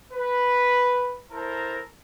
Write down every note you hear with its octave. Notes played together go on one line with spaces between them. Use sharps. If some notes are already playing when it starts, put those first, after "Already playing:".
B4
E4 A4 A#4 C5 A#5